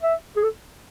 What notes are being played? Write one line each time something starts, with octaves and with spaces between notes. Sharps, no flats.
E5
G#4
A4